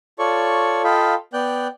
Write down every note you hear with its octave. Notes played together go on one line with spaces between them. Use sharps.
F4 A4 C#5 D5 C#6
F4 A4 D#5 F5 G5 B5
B3 D5 G5 F#6 G6